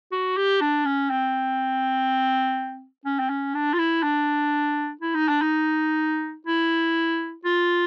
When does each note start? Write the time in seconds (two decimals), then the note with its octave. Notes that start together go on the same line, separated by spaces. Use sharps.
0.12 F#4
0.37 G4
0.61 D4
0.85 C#4
1.10 C4
3.05 C#4
3.19 C4
3.30 C#4
3.55 D4
3.73 F4
3.78 E4
4.03 D4
5.01 E4
5.15 D#4
5.29 D4
5.42 D#4
6.47 E4
7.45 F4